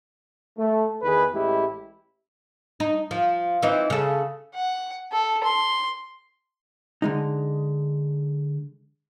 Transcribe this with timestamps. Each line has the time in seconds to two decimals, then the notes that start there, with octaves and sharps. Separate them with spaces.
0.57 A3
1.02 E2 D#3 G#4 B4
1.33 A1 G#3 E4 G4
2.80 D#4
3.11 F3
3.62 E3 C4 D#4
3.90 C#3 A4
4.55 F#5
5.12 A4
5.44 C6
7.02 D3 G#3 D#4